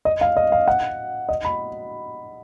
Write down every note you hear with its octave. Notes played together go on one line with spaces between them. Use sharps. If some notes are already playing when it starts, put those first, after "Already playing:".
D#5
F5
D#5
F5
F#5
D#5
B5